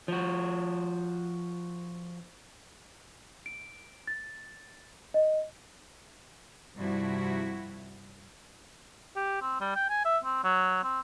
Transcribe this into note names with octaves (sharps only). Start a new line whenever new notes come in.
F3 F#4
D7
A6
D#5
G2 C3 F3 G3 E4 F#4
G4
C4
G3
G5
G#5
E5
C4
F#3
C4